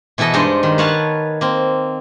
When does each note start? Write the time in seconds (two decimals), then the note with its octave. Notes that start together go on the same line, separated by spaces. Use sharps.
0.18 B2 E3 E4 A4 D#5
0.34 G2 G#3 D#4 C5 D#5
0.63 D#3
0.78 B4 C#5 F5 F#5 A5
1.41 A#3 C4